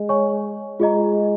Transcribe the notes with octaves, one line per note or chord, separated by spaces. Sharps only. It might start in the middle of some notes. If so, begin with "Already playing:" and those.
Already playing: G#3
C#5 G#5 C#6
G#3 F4 G#4 D#5 A#5